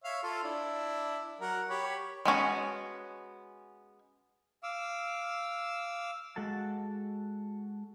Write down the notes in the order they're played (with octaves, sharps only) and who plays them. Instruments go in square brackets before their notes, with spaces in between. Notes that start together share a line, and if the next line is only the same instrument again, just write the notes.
[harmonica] C#5 E5 F5
F4 A4
D4 E4
F#3 A#4 F#5
G4 C#5 B5
[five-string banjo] G#3 B3 C#4 F#4
[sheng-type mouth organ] F5 D6 E6
[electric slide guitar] G#3 F#4 A4 A5